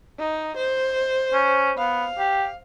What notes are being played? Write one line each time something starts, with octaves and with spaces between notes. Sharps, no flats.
D#4
C5
C#4
B3 F5
G4